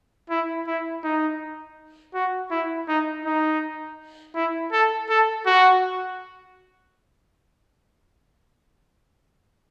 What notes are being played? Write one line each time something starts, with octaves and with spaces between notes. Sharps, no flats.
E4
E4
D#4
F#4
E4
D#4
D#4
E4
A4
A4
F#4